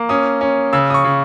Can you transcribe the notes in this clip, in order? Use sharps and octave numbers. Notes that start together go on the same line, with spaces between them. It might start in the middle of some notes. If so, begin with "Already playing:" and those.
Already playing: A#3
C#4 D#6
C#4
C#3 E6
D#6
C#6
C#3